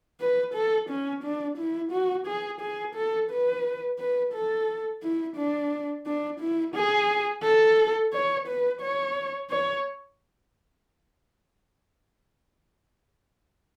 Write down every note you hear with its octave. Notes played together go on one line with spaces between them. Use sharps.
B4
A4
C#4
D4
E4
F#4
G#4
G#4
A4
B4
B4
A4
E4
D4
D4
E4
G#4
A4
C#5
B4
C#5
C#5